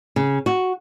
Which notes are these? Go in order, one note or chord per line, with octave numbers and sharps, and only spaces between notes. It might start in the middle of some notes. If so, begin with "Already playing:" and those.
C#3
F#4